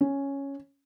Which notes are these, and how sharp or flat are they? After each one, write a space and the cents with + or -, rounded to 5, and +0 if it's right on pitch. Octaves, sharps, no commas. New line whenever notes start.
C#4 +0